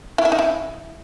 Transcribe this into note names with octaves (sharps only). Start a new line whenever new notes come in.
E4
E5
D#4
E4